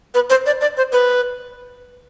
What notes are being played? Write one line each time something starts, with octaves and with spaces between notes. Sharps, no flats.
B4
C5
D5
D5
C5
B4